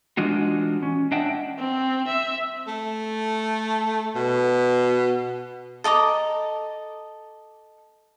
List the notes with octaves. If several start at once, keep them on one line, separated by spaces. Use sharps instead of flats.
E3 G#3 D4 D#4 F4 F#4
C#4
D4 D#5 E5 F#5 G5 A5
C4
E5
A3
B2
A4 D#5 A#5 D6